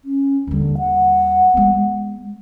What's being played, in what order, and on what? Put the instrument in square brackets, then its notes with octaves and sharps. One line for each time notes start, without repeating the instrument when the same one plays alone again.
[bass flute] C#4
[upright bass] D#2 G3 [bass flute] D3
[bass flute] F#5
[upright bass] G#3 B3